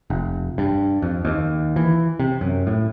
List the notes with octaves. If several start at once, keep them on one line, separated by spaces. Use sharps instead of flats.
F1
G2
F2
D#2
E3
C3
F#2
A2